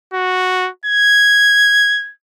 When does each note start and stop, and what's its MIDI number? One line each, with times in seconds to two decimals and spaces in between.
0.14 0.69 66
0.86 2.12 92